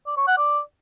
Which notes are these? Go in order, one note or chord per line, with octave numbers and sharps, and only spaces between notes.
D5
C#5
F#5
D5